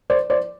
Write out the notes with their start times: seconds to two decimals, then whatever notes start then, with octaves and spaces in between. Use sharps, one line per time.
0.10 C5 D5
0.30 C5 D5